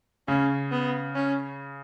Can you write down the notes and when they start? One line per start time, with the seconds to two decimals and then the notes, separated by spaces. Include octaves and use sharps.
0.28 C#3 C#4
0.71 B3
1.15 C#4